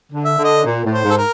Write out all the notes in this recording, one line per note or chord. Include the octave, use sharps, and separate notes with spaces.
D3
E5
D3
D#5
A#2
A2
C5
G#2
A4
A#4